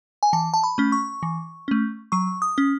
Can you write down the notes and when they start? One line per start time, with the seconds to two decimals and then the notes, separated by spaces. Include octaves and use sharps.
0.23 G#5
0.33 E3 A5
0.54 A5
0.64 B5
0.78 A3 C#4
0.92 C#6
1.23 E3
1.68 A3 C#4
2.12 F#3 C#6
2.42 D#6
2.58 C#4